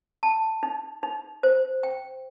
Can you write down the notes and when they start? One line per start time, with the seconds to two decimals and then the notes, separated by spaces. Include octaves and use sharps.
0.23 A5
0.63 D#4
1.03 D#4
1.43 C5
1.83 G5